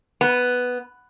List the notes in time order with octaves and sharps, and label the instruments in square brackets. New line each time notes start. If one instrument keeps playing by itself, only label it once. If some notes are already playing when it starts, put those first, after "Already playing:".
[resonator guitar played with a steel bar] B3